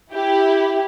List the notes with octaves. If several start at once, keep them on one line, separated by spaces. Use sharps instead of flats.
E4 G4